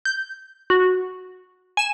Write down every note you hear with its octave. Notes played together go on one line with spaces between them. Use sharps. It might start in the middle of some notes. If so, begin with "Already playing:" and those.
G6
F#4
G#5 E7